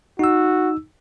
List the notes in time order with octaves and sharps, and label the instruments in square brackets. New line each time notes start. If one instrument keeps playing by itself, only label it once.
[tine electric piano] D#4 E6 [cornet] F#4